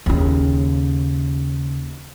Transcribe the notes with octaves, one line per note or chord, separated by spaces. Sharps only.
D#2 C#3